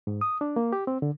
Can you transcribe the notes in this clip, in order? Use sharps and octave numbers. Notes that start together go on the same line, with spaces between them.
G#2
D#6
D4
A#3
G4
C4
D3